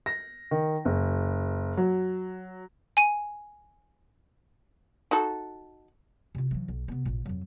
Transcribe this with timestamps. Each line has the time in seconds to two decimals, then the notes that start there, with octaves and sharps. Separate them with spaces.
0.06 A#6
0.51 D#3
0.85 F#1
1.77 F#3
2.97 G#5 D#7
5.11 D#4 F#4 A4
6.35 C3 F4
6.51 E3 F#3
6.68 B1
6.88 C3 B3
7.05 A1 A#2
7.26 F2 F#3